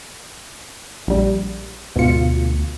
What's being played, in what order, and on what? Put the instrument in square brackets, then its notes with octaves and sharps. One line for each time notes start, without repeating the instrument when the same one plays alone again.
[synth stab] A#1 G3
[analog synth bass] D2 [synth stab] G#2 C#7 [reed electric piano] B2 F4